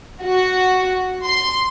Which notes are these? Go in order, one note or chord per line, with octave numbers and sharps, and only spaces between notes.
F#4
C6